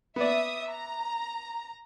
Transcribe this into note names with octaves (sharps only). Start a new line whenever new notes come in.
B3 D5 E5 D#6
A#5